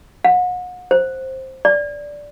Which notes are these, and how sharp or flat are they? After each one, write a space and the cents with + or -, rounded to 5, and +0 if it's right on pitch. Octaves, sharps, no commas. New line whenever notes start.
F#5 -35
C5 +10
D5 -10